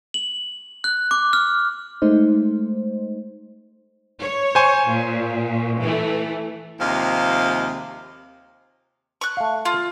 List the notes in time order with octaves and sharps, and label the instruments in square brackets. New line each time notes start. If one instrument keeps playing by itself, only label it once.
[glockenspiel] F#7
F#6
D6
F6
[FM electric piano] G#3 A3 D#4 C5
[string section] C#5
[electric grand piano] C5 G#5 C#6
[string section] A#2
E3 A3
[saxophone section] D#2 C3 F3 G#3 F5
[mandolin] C#6 F#6
[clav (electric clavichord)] A3 F5
[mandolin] F4